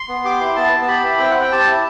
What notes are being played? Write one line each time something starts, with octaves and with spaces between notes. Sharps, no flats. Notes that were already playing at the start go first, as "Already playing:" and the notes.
Already playing: C6
B3
G4 D6
E4 C6
B3 A5
B3
A5
G4 B5
E4
C4 G5
C4 F#5
G5
G4 A5
E4